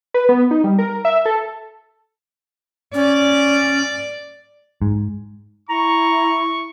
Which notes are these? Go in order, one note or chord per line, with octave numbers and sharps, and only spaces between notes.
B4
B3
D#4
G3
A#4
E5
A4
C#4 D5
G#2
E4 A#5 C#6